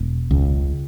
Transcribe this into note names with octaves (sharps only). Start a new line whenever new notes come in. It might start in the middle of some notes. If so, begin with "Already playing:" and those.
Already playing: E1
C#2